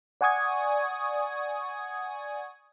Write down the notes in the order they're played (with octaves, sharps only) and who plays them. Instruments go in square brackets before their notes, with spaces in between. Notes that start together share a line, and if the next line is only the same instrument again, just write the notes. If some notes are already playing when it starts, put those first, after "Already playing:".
[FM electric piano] D5 F#5 G#5 C#6 D#6 G#6